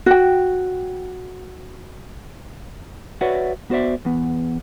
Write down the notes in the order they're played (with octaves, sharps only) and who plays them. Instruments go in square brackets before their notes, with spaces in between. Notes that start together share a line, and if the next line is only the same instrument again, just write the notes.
[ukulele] F#4 G5
[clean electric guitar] F#4 B4 C#5 D5 E5 F#5
B3 F#4 C5 D5 E5
E2 B3